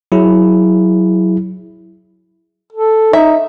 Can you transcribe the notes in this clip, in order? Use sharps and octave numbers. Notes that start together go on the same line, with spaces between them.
F#3 E4 G#4
A4
D#4 E5